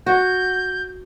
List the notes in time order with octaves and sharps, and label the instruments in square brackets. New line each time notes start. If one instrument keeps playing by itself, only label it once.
[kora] F#4 [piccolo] G6